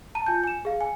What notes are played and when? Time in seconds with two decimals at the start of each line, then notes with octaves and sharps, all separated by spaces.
0.15 A5 A#5 D#7
0.26 F4 G#5 G6
0.44 G#5 E7
0.65 G#4 F5
0.81 G#5